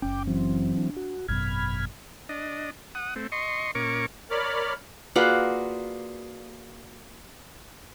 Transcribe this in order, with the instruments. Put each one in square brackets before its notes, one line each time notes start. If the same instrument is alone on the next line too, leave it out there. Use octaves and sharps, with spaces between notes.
[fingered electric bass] F#1 C#4 [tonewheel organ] G5 D6
[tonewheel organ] E3 F#3 C4
[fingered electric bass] D4
[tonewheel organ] F#4
[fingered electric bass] G#1 F#2 B2 [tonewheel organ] B5 F6 G#6
[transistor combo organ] D4 D#5
F#5 D#6
A3 C4
D#5 C6 C#6
A#2 C#4 A#4 C#6 D6
[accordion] A#4 C#5 D5 B5 D6 F6
[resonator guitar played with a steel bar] A#3 F4 F#4 G#4 B4 D5